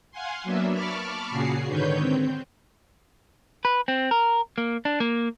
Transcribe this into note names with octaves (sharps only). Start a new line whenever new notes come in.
F5 F#5 G#5 C6
F#3 A#3 B3 D4 E5
A5 B5 C#6 D6 F6
A#2 C#3 F#4 G#4 C7
G#2 D3 D#3 B4 C#5 G6
C4
B4
C4
A#4
A#3
D4
A#3